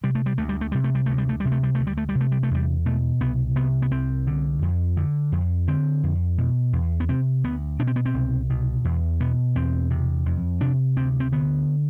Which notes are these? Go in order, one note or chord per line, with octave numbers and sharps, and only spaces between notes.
C3 G3
A3
G3
D2 A3
G3
A3
C3 G3
A3
G3
D2 A3
G3
A3
C3 G3
A3
G3
D2 A3
G3
A3
G3
C3
A3
G3
A3
E2 G3
B2 A3
C2 B3
C3 B3
B3
C2 C4
D3
F2
D3
F2
D3 C4
F2
B2
E2
B3
C3 C4
D2 B3
B2 D4
C4
B3
C4
C2
B2
E2
B2 B3
E2 C4
C3
F2
C3 D4
D2 C4
C4
D3 B3